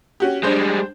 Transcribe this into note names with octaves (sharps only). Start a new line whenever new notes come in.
C#4 F#4 G4
G3 G#3 D4 C5 G6